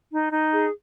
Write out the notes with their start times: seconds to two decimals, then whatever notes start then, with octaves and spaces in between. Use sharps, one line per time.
0.12 D#4
0.32 D#4
0.53 G#4